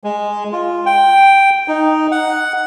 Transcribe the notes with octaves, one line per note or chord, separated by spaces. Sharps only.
G#3
F4
G5
D#4
F#5